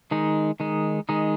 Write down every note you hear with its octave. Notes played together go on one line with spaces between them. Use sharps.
D#3 G#3 D#4
D#3 G#3 D#4
D#3 G#3 D#4